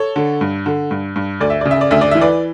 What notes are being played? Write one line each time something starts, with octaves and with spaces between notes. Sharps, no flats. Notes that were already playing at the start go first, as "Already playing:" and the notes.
Already playing: A4 C#5
D3
G2
D3
G2
G2
D2 D5
E5
C#3 D5
E5
D5
D2 E5
D5
E3 E5
B4 D5